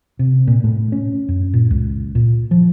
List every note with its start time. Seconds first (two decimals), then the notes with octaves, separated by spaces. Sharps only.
0.19 C3
0.47 A#2
0.64 A2
0.92 C#4
1.29 F#2
1.54 A#2
1.71 C#2
2.15 A#2
2.51 F3